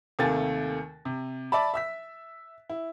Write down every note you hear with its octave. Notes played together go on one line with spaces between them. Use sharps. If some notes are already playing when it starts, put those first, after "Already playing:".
D#2 C3 D#3 A3 G#5 A6
C3
D5 E5 A5 B5
E5 E6 B6
E4